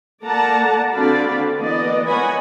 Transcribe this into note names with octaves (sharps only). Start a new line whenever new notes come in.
A#3 A4 D5 F#5 A5 A#5
D3 C4 F#4 D5 F5 B5
E3 A#3 B3 D5 D#5
A#4 C#5 D#5 F#5 G#5 B5